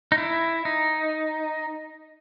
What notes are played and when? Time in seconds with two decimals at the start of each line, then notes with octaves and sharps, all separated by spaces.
0.12 D#4
0.18 E4
0.65 D#4